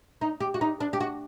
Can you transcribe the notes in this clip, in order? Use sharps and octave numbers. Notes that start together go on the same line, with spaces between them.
D#4
G4
F#4
D#4
D4
G4
F#4